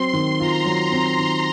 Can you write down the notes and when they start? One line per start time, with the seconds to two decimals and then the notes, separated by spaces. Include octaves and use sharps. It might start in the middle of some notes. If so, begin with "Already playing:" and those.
Already playing: F#3 C4 C6
0.13 D#3
0.40 F4 A#5
0.66 F#3
0.91 C4
1.18 D#3